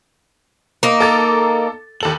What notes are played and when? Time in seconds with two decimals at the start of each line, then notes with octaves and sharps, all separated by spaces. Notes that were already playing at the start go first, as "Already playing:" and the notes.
0.83 A#3 D#4
1.00 A4 D6 A6
2.01 D#2 A4 F#7